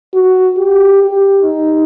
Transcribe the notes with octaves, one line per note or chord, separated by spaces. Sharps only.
F#4
G4
G4
D#4